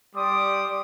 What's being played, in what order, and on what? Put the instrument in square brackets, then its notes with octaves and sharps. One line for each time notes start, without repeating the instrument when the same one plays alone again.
[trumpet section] G3 D5 C6 D6 D#6